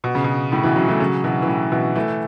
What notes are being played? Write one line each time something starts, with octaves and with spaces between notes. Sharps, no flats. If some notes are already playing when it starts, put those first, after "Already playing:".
B2
C#3
B2
A2 C#3
B2 E3
C#3 F#3
E3 A3
C#3 F#3
B2 E3
E3
A2 C#3
B2 E3
E3 A3